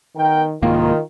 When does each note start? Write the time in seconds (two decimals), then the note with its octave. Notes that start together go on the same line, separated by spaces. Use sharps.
0.17 D#3 B3 A#4 G5
0.62 C2 G#2 D#3 A#3 F4